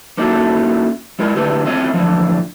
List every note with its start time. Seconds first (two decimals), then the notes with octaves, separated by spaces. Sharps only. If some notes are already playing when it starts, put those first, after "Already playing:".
0.17 A#3 C#4 D#4 E4 F#4 A4
1.19 G#3 E4 A#4
1.36 D3 A3 E4 G4 B4
1.66 A3 C4 C#4 E4 F4 D#5
1.93 A2 D3 E3 F3